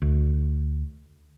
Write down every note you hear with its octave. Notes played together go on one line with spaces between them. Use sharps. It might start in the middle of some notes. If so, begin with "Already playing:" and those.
D2